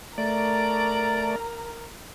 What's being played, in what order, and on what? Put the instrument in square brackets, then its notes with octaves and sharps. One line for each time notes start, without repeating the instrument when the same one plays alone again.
[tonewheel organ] A3 D5 [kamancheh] A#4 A#5